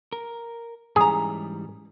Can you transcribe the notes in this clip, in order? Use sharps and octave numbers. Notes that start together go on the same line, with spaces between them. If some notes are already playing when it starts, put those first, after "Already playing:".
A#4
G#2 E3 G3 C#4 G#4 A#5